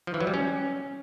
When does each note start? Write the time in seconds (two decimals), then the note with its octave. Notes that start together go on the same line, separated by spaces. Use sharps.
0.07 F3
0.14 E3
0.21 F#3
0.27 G3
0.34 C#4